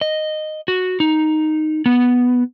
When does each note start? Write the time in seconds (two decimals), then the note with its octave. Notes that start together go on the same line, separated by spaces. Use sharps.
0.01 D#5
0.68 F#4
1.00 D#4
1.86 B3